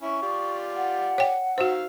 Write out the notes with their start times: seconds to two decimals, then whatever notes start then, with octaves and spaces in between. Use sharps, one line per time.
0.03 C#4 E4 C#6
0.22 F4 G4 D5
0.76 F#5
1.18 C#5 G5
1.58 D#3 F#4 C5 F5 E6